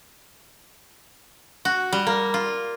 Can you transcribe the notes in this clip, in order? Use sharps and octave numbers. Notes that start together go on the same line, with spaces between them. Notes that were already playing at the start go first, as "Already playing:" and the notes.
F#4
G3
A#3
F4